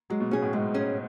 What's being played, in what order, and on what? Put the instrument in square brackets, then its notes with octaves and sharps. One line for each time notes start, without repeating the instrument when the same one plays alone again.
[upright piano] F#3 [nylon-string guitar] G#3
[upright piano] B2
[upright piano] B2 [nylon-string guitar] C#4 G#4
[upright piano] A2
[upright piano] G#2 [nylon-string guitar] G#3
[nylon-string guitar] C#4 G#4